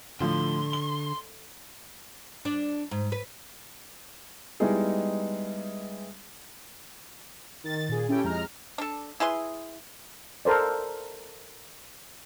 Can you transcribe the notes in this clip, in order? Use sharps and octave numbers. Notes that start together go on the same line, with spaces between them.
A2 D3 F3 C6
G7
D4
G#2
B4
G3 G#3 B3 D#4 E4 G#4
D#3 A6
A#2 G#4
C#4 E4 G4 A4 G5
F2 G#3 A#5 F6
D4 A4
E4 G#4 B4 C6
A4 A#4 C5 D5